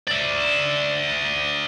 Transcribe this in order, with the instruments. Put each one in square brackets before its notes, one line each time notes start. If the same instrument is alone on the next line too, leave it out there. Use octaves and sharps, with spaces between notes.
[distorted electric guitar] D5 E5